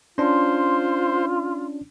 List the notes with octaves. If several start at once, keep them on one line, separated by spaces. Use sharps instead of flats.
C#4 D4 F4 C5